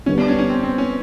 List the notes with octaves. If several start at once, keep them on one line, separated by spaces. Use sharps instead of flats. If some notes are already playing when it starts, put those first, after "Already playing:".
D3 G3 B3 C#4
D4
C#4
C#4
C4
C4
C#4